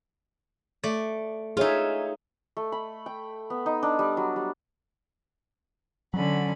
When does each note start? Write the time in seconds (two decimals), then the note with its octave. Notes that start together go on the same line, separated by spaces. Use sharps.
0.84 A3 D5
1.57 D#4 F4 G#4 C#5 E5
2.57 A3
2.72 B5
3.06 G5
3.50 B3
3.66 D#4
3.83 D4
3.99 G3
4.17 F#3
4.36 G3
6.14 D3 F#3 C#4 B5